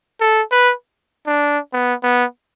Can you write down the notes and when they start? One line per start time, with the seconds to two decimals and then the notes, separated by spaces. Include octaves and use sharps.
0.21 A4
0.52 B4
1.27 D4
1.73 B3
2.04 B3